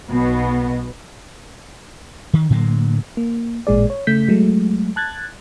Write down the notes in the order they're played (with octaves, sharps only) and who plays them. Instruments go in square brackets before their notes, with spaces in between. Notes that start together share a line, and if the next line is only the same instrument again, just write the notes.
[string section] B1 B2 B3
[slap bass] D#3
A2 D3 F#3 A#3
[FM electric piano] A#3
A1 A#2 G#3 G#4 D5
C#5
C#3 A3 G6 B6
F#3 G#3 A3
A5 F#6 G#6 A6